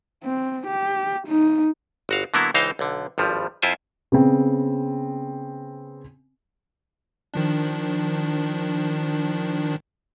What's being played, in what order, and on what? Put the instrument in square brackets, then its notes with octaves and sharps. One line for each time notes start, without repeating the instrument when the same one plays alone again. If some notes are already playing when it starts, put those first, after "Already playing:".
[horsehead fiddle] C4
G4
D#4
[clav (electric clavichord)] G1 F#4 F5
D3 F#3 A#3 B3 E4
C#2 E3 D#4 C5 F5
B1 D3
G#1 G2 F3 G3
F2 E4 F4 C5 G#5
[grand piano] C#3 B3 C4
[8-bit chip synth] D#3 F3 D4